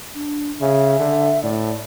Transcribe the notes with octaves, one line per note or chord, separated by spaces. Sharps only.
D4
C#3 E5
D3
A2 D5